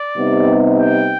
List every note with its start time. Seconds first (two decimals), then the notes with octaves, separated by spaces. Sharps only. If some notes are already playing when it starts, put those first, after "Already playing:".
Already playing: D5
0.16 C3 G3 B3 D#4
0.80 G5